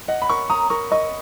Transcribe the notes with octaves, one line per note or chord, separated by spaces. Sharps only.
D#5 F#5
B5
A#4 C#6
A#5 D#6
A#4 C#6
D#5 C#6